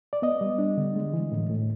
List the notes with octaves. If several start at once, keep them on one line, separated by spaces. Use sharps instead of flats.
D5
B3 D#5
G3
D4
D3
G#3
E3
A2
A2